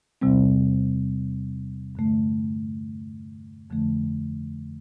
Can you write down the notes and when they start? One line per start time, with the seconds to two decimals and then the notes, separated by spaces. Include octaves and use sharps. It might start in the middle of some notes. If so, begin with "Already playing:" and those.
0.21 E2 C3 G3 C4
1.95 G2 D3 A3
3.70 F2 D3 F3 A3